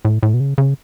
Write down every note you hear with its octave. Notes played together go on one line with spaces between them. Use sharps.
A2
A2
B2
C#3
C#3